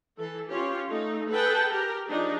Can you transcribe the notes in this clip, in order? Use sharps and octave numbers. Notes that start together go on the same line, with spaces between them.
E3 A4
C#4 F4 G4 C#5
A3 D#4
G#4 A4 B4 F#5 G5 A5
G4 A#4
F3 D4 D#4 G#4